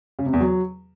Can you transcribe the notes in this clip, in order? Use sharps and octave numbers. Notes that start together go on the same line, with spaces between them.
C#3
C3
E2
F#3